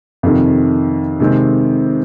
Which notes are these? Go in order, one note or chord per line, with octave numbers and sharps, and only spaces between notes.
F2 C3 D#3
C3 D#3 G#3 C4